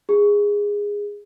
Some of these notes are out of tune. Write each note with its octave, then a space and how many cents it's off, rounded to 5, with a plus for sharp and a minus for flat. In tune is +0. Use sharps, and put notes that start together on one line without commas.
G#4 -15